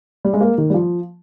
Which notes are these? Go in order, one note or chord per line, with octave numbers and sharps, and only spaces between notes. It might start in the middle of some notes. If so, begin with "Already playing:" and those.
G3
G#3
A#3
D#3
G3
F3